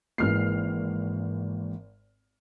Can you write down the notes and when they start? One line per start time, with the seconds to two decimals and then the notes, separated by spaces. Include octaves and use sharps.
0.18 G#1 E3 G#3 A#3 F6 C7